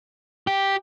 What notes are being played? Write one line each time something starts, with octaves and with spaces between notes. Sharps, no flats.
G4